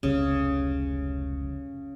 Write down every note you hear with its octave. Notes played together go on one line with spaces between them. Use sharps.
F1 C#2 C#3 G3 C#4